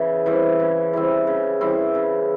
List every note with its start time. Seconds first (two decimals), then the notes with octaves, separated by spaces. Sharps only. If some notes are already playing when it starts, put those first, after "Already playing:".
Already playing: C#3 E3
0.26 E3 G3 C4
0.60 C#3
0.93 E3 G3 C4
1.27 C#3
1.61 E3 G3 C4
1.95 C#3